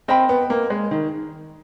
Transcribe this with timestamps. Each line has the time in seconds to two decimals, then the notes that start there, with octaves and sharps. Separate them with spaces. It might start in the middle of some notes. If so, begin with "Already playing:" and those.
0.08 C4 A#4 D#5 G5 B5
0.29 B3
0.50 A#3
0.70 G#3
0.91 D#3